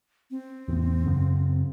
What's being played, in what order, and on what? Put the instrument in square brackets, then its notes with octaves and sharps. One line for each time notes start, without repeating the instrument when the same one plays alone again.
[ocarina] C4
[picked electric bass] E2 A2
F#2 C#3